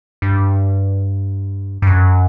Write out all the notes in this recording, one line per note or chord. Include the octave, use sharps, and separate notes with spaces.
G2
G2
F#2